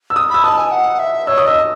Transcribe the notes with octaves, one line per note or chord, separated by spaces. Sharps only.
E6
D#6
B5 E6
A5 D#6
G#5
F#5
E5
C#5 E6
D#6
D#5 E6